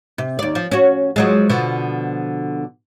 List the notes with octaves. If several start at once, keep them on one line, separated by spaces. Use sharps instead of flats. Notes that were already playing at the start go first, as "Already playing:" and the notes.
C3
D#2 D5
F3
C#4 F#4
F3 F#3 G#3
B2 D3 F3